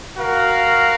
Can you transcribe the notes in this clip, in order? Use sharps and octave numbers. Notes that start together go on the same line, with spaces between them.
F#4 A#4 F5